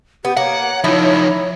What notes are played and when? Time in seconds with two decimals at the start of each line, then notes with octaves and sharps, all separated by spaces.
0.25 B3 G4
0.37 A#3 C#5 F#5
0.84 F3 D#4 E4